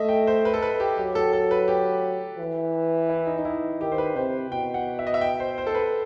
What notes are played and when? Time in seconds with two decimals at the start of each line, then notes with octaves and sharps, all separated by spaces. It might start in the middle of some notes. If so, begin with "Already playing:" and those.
Already playing: A3 D#5 E5
0.09 G5
0.27 C5
0.45 B4
0.54 A4
0.62 B4
0.80 G4
0.97 F#3 G4
1.15 A4
1.33 A4
1.51 B4
1.68 G4
2.38 E3
3.09 E4
3.27 D#4
3.38 D#4
3.45 E4
3.80 D#3 G4
3.92 C5
3.98 B4
4.15 C3 C5
4.51 B2 G5
4.74 F#5
4.99 E5
5.07 D#5
5.14 E5
5.21 G5
5.40 C5
5.58 C5
5.67 A4
5.75 B4